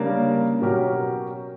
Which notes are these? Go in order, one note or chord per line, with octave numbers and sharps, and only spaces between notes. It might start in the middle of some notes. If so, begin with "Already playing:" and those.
Already playing: C#3 G3 A#3 D4 A#4
B2 F#3 C#4 G4 A#4